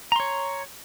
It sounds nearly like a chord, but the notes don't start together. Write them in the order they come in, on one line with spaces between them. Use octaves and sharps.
A#5 C6 C#5